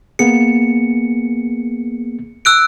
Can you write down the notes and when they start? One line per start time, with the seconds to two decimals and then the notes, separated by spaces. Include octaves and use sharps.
0.19 A#3 B3 G#4 C#7
2.45 E6 F#6 D7